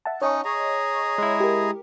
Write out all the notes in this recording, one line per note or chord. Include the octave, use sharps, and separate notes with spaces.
E5 F#5 A5
C#4 D#4 C#5 D#5 C#6
G#4 A#5
G#3 E4
G4 A#4